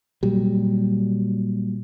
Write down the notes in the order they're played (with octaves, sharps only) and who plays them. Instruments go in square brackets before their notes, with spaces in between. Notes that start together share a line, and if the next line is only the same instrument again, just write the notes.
[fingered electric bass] A#2 F#3 G3